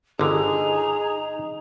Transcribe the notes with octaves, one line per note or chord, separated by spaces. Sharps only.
G1 D3 D#4 G#4 A#5